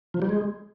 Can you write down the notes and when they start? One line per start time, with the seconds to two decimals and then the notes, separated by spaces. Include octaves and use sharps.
0.14 F3
0.22 G3
0.29 G#3